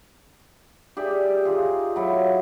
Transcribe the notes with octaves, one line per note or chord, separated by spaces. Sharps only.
G4 G#4 D5 E5
D#4 F4 G#4
F#3 E4